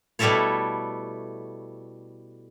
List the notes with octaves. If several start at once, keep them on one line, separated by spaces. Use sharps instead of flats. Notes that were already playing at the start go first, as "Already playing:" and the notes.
B2 G3 A3 E4 A4 C#5